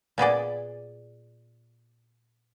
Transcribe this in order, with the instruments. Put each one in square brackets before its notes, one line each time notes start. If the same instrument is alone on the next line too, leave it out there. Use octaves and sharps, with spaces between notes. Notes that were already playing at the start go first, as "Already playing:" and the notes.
[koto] A#2 B3 G#4 D5